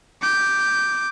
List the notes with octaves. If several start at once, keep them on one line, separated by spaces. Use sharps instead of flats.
D6 G6